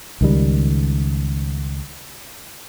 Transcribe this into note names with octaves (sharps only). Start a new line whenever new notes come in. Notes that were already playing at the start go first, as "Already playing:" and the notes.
C#2 D#3 G3